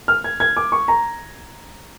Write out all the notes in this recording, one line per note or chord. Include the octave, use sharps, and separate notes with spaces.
F6
G#6
G#6
D6
C#6
A#5